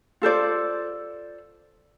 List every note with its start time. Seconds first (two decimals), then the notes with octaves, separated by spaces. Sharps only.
0.22 F4 A4 C5 D5